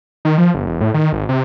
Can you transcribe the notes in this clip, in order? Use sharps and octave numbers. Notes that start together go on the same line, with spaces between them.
D#3
F3
G1
E1
A2
D#3
G#1
C3